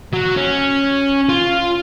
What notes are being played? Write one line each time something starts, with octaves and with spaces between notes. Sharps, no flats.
F#3
C#4
F4